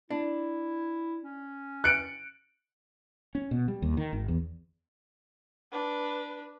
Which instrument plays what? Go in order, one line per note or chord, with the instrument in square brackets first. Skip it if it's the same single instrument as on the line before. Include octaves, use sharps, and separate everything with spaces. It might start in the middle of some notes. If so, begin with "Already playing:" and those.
[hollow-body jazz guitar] D4 [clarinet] E4
[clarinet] C#4
[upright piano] F#6 C#7 D7
[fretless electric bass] C#4
B2
G3
D#2
D#3
G#1
E2
[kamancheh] D4 B4